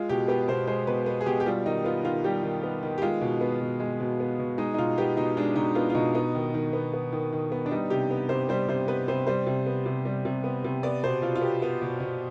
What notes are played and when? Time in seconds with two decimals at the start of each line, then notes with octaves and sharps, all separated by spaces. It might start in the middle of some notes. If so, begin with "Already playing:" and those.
Already playing: G#3 F4
0.09 B2 G4
0.28 B3 G4
0.48 B2 C5
0.67 G#3 C5
0.87 B2 B4
1.06 B3
1.21 G#4
1.26 B2 G4
1.40 G4
1.46 G3 F4
1.66 D#3 D#4
1.84 B3 F4
2.05 D#3 F4
2.24 G3 G4
2.43 D#3
2.63 B3
2.83 D#3
2.98 G4
3.02 G#3 F4
3.21 B2
3.41 B3
3.60 B2
3.80 G#3
4.00 B2
4.20 B3
4.39 B2
4.58 G#3 D#4
4.74 D#4
4.78 B2 F4
4.98 B3 G4
5.17 B2 D#4
5.37 G#3 D4
5.56 B2 D#4
5.75 B3 F4
5.90 F4
5.95 B2 D#4
6.15 B3 D#4
6.35 D#3
6.54 D#3
6.73 B3
6.94 B3
7.13 D#3
7.33 D#3
7.52 B3
7.66 D4
7.71 G3 D#4
7.90 C3 G4
8.11 B3
8.29 C3 C5
8.49 G3 C5
8.68 C3 C5
8.88 B3 B4
9.08 C3 C5
9.27 G3 C5
9.47 C3
9.66 B3
9.86 C3
10.05 G3
10.25 C3
10.44 B3
10.64 C3
10.83 B3 D5
11.03 B2 C5
11.22 B2 F4
11.36 F4
11.42 B3 G4
11.62 B3
11.82 B2
12.00 B2